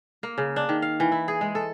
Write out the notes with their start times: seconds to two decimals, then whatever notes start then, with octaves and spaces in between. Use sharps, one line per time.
0.23 A#3
0.38 C#3
0.56 D4
0.69 D#3
0.82 F5
1.00 E3
1.12 E4
1.28 G#4
1.41 G#3
1.55 A4